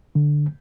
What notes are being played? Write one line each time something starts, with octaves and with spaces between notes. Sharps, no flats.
D3